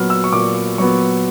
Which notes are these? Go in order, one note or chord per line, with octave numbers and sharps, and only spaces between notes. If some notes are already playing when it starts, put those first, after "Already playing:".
Already playing: A#2 F#3 B3 F6
E6
C#6
A#2 D6
F#3 B3 C#6